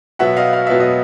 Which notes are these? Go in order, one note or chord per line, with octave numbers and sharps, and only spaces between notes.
B2 F#3 B3 E5 F#5
D#5 F5
F5
B2 F#3 B3 E5
D#5